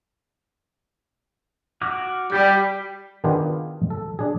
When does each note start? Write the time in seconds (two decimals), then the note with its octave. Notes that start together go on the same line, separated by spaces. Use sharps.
1.81 F#4 D6 F6
2.32 G3 G4 G6
3.24 D#3 B3 D4 F4 G4 G#4
3.90 A4
4.19 D4 G#4